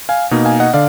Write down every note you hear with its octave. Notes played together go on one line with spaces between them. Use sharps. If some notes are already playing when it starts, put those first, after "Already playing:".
F5 G#5
B2 A#3 D#4
F5 G#5
D#5 F#5
D3 D5 F5